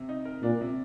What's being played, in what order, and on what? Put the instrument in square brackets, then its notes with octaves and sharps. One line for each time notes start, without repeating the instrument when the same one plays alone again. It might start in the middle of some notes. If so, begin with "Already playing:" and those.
Already playing: [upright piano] C3
D#4
A#4
[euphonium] A#2 [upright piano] D4
[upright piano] C3